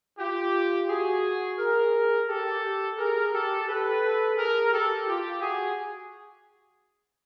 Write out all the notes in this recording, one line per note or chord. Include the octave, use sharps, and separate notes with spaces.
F4 G4
F#4 G#4
G#4 A#4
G4 A4
G#4 A#4
G4 A4
A4 B4
G#4 A#4
G4 A4
F4 G4
F#4 G#4